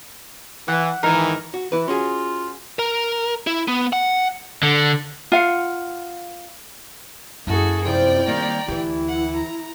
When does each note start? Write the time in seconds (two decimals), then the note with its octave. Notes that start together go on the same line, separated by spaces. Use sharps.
0.68 E3 F#5
1.03 G#2 D#3 E3 D#4 A#4
1.54 F#4
1.72 E3 E4 B4
1.88 C#4 F4 F#4 G#4
2.79 A#4
3.47 E4
3.68 B3
3.93 F#5
4.63 D3
5.32 F4 F5 F#5
7.47 F#2 A#3 E4 F#4 G#4 A4
7.85 F2 C3 F3 E4 D5 G5
8.27 D#3 G3 A#3 A#5
8.68 D2 E3 E4 G4
9.07 F#5
9.36 A#5